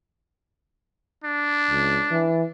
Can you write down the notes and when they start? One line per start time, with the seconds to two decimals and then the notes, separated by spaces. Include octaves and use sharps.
1.24 D4
1.70 C#2
2.11 E3